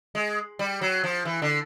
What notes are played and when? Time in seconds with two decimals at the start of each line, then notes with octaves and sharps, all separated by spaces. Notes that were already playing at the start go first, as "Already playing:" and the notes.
0.15 G#3
0.59 G3
0.81 F#3
1.04 F3
1.25 E3
1.42 D3